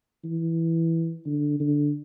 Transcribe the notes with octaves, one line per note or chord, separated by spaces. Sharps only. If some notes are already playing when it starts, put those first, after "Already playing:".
E3
D3
D3